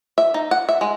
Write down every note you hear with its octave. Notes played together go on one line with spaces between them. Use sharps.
E5
D#4
F#5
E5
G#3